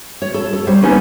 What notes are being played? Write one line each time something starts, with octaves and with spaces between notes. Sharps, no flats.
C#5
A4
A4
G3 C4 C5 C#5
A#3 B3 C#4 D#4 A#4 B4